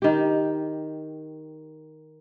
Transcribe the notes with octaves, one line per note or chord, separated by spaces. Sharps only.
D#3 G4